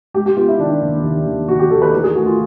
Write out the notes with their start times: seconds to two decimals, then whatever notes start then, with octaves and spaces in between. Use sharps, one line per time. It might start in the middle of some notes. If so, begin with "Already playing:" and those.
0.14 G#3 G4
0.26 G4
0.36 B3 F4
0.48 E4
0.59 D#3 D4
0.82 D#2
1.04 D#2
1.26 D#2
1.48 D#2 F#4
1.60 G4
1.70 D#2 A4
1.82 B4
1.93 E3 A#4
2.04 G#4
2.15 A3 F#4
2.26 F4